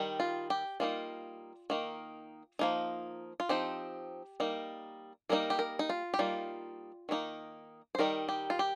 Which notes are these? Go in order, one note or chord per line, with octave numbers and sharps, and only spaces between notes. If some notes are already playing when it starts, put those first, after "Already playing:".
Already playing: D#3 G3 D#4
F4
G4
G3 A#3 D#4 F4
D#3 A#3 D#4
F3 A#3 D#4
F4
F3 C4 D#4 G4
G3 A#3 D#4
G3 A#3 D#4 A#4
G4
A#4
D#4
F4
G4
G3 A#3 D#4 F4
D#3 A#3 D#4
C5
D#3 G3 D#4 A#4
G4
F4
G4